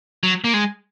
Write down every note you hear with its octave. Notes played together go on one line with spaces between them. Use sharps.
F#3
A#3
G#3